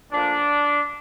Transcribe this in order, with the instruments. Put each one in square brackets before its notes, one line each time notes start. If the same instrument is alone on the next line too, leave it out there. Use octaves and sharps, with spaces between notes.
[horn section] A#2 F3 A3 D4